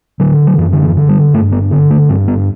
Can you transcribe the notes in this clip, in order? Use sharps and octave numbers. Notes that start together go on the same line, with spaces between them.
D3 F#3
F#3
F#2 E3
D3
E3
D3
G3
G2 A3
B3
D3 B3
A3
G2 C4
B3